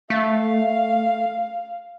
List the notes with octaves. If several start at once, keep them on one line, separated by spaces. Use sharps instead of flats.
A3 F5